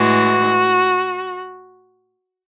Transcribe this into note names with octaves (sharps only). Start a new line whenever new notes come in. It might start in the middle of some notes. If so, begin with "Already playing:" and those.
Already playing: A2 E3 G#3 F#4